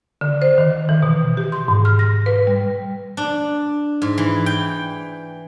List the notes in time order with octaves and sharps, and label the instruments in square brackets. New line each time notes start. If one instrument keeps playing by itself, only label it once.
[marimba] D3
C5
D#3
E3
B2
G4
C6
G#2
F6
A#6
B4
G3
[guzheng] D4
G#2
E3
G5